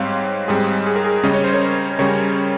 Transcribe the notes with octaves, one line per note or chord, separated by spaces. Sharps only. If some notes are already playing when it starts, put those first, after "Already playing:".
Already playing: G#2 G3 C4 C#5 F5
G#2 G3 C4 G#4
G#4
A#4
G#4
C#3 G3 C#4 D#5
C#5
C5
A#4 C#5
C#3 G3 C#4 A#4 C#5